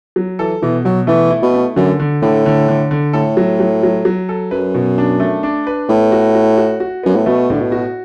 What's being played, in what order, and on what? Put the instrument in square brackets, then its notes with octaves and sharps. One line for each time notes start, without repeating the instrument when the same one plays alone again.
[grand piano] F#3
[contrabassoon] E3 [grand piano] A4
[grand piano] B2 [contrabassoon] E3
[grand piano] B2 [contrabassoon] F#3
[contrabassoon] E3 [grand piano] A3
[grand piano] E4
[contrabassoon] B2
[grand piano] A3
[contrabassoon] F#2 [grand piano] D3
[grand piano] D3
[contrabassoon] A2 [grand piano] D3
[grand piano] D3
D3
D3
[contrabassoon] A2 [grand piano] A4
[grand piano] F#3
F#3
F#3
F#3
A4
[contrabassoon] F#2 [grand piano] B4
[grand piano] B2
D4
A3
D4
B4
[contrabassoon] A2 [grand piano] B3
[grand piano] F#4
F#4
F#4
F#4
[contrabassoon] F#2 [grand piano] B3
[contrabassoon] A2
[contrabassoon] B2 [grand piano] A3
[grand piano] A2 [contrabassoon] D3
[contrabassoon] B2
[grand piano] F#4